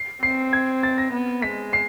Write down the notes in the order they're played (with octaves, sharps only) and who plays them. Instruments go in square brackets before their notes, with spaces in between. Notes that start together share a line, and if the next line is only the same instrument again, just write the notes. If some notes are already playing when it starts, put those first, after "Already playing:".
Already playing: [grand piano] C7
[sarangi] C4 [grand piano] C7
[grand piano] G#6
A6
A#6
[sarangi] B3
[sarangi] G#3 [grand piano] B6
[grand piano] C7